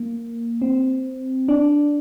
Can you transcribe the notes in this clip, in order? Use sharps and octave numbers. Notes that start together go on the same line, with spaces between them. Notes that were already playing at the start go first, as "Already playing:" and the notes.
Already playing: A#3
C4
D4